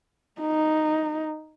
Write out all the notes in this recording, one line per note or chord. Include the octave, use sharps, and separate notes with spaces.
D#4